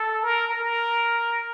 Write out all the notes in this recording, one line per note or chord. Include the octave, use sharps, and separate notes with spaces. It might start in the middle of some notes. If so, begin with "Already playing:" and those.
Already playing: A4
A#4
A#4